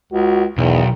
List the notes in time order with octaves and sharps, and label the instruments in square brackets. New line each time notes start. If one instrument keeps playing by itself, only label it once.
[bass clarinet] C#2 [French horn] F#4
[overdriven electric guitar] B1 [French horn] E2 [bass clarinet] D#3